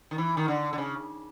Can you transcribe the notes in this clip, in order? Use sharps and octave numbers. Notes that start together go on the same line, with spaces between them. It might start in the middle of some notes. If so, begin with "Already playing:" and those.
D#3
E3
D#3
D3
D3
C#3